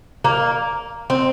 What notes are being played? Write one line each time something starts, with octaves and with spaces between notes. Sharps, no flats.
A#3
C4